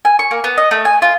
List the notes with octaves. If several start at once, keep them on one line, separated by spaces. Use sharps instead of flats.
G#5
C#6
A#3
B3
D#5
A3
G#5
F4